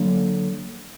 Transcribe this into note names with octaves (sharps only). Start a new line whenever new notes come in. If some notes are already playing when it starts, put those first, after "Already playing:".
Already playing: D3 F#3 A#3